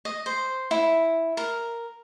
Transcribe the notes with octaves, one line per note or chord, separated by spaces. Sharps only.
D#5
C5
E4
A#4